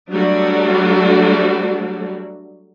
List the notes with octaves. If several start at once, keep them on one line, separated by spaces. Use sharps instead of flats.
F#3 G3 A3 D4 F#4